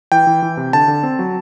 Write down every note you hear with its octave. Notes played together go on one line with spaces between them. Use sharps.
E3 G5
E3
E3
C3
D3 A5
D3
C4
F#3